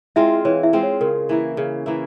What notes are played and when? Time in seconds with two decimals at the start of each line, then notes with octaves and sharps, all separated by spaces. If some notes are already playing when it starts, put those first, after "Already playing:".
0.16 G#3 C4 E4 F4 E5
0.45 E3 C#5
0.63 E4 E5
0.73 G#3 C4 F4
0.83 C#5
1.01 C#3 A#4
1.29 E3 A#3 E4
1.57 C#3
1.86 E3 A#3 E4